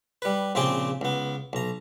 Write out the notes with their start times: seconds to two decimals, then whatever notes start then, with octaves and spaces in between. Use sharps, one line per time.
0.22 G3 B4
0.55 A#1 C#3 C4 G4 G#4 G5
1.01 C#2 B3
1.53 B1 A#5